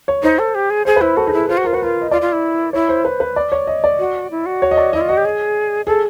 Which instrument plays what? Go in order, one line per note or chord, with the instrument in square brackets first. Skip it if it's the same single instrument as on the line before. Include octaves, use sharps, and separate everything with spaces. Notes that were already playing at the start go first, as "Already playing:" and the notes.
[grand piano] C#5
[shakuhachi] D#4 [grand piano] C5
[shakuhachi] A4
G4
G#4
[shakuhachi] G#4 [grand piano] C5
[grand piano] B4
[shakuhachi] E4 [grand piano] C5
[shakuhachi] F#4 [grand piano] A4
[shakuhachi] D#4 [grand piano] G#4
[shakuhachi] E4
[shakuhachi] F4 [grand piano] C5
[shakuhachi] F#4
[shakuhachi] F4 [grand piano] A#4
[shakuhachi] F#4 [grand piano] B4
[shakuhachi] F4 [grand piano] A#4
[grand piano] D#5
[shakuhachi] F4 [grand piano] D5
[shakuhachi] F4
E4
[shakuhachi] E4 [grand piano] C#5
[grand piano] C5
B4
B4
D5
C#5
D#5
D5
[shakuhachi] F#4
E4
F#4
[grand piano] C#5
D#5
D5
[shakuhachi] E4 [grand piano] D#5
[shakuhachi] F4
[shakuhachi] F#4 [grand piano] D#5
[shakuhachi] G4
G#4
[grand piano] G#4 [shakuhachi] A4